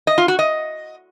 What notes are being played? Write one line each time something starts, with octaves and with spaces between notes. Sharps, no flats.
D#5
F4
F#4
D#5